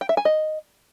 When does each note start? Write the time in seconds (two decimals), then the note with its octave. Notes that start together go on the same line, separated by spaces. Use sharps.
0.01 G5
0.09 E5
0.17 G#5
0.25 D#5